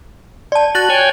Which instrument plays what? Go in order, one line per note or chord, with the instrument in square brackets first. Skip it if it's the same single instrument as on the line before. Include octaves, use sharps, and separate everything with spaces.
[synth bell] D5 A5
[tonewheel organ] F#4 [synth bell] F#6 A6 F#7
[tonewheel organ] C#5 G5 G#5